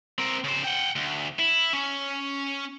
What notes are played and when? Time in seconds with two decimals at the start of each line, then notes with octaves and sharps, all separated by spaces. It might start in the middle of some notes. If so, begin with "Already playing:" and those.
0.18 C4 A#4
0.44 C#3 C5
0.64 F#5 G5
0.96 D2
1.39 E4
1.73 C#4